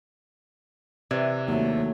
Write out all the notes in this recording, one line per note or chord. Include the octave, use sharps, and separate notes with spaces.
C3 E3 D5 G#6
D#2 F#3 A3